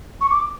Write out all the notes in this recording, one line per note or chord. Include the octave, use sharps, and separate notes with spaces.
C#6
D6